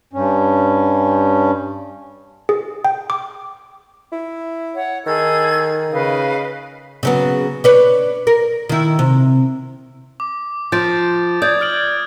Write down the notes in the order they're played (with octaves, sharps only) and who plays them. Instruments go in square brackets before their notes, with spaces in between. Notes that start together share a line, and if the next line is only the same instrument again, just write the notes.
[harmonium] G2 C#4
[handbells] G#4
G5
D6
[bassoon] E4
[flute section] C#5 F#5
[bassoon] D#3 [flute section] G#4 G#6 [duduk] A4
[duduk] C#3 [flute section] B4 D#5 F5
[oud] C#3 F#3 B3
D4 B4 C#5
A#4
D#3 E4
C3
[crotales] D6
[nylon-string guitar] F3 [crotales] G6 A6 D7
[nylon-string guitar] D5 [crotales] D#6 G6 G#6
[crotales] F6 D7 F#7